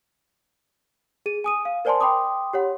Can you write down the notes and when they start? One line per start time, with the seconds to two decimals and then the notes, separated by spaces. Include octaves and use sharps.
1.26 G#4 D#7
1.44 G#5 D#6 D#7
1.65 F5
1.85 A#4 C5 D5 G#5 A5 C6
2.01 G5 B5 C6 D6 D#6
2.53 G4 C#5 F#5